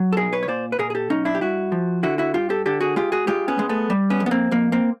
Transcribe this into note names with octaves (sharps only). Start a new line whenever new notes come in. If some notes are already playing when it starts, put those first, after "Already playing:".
Already playing: F#3
A4
B1 G#4 A#4
B4 C#5
C#5
A#2 C5 D5
B4
A#2 G#4 A#4
G#4
G4 A4
B1 C#4 D#4
D4 E4
G4
G2 E4 F#4
F3
D3 E4 F#4
E4 F#4
G2 F4 G4
G4 A4
D3 G4 A4
F#4 G#4
G#3 F4 G4
F#4 G#4
G#3 F4 G4
B3 C#4
G#3
A3 B3
G3
B3 C#4
F2
B3
A#3 C4
F2 A#3
A#3 C4